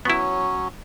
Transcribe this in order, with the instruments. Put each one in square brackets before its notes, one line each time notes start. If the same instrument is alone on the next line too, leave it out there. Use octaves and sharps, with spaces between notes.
[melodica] F#3 C#4 [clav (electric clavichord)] B3 E4